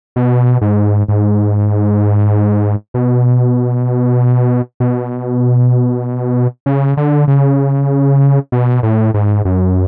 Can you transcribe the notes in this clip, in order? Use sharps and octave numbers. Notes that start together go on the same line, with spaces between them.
B2
G#2
G#2
B2
B2
C#3
D3
C#3
B2
A2
G#2
F#2